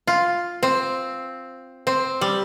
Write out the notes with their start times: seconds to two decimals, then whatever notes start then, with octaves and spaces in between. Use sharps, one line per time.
0.07 F4
0.63 C4
1.87 C4
2.21 G3